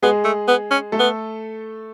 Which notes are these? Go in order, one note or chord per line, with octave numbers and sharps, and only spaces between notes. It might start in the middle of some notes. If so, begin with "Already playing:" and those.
G#3 B3 G#4
A3
B3
C#4
A3 A4
B3